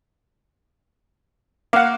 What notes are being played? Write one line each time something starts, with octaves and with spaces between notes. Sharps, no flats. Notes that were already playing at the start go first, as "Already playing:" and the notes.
A#3 F5 F#5